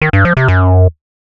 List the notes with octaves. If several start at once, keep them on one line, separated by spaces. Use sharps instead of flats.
D#3
G2
F3
C3
F#2